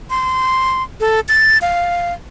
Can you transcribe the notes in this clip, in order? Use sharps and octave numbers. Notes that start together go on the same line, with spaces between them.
C6
A4
A6
F5